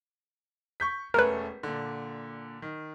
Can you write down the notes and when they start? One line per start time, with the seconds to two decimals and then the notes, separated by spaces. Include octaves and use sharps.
0.80 C#6 G6 B6
1.14 E1 A3 C#4 A#4 B4
1.63 A#2 D3
2.62 D#3